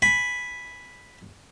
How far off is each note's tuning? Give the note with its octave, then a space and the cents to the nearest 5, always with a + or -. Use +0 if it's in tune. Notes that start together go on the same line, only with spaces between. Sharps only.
G#5 +0 B5 +0